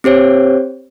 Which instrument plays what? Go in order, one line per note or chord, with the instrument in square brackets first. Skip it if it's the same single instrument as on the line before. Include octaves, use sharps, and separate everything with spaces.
[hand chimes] C4 G4 C5 C#5